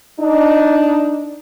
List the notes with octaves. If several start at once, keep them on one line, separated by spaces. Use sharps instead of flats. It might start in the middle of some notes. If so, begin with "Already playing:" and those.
D4 D#4